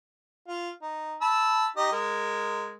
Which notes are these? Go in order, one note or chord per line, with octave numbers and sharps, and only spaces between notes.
F4
D#4
A5 B5 E6
D#4 G4 D#5
G#3 A#4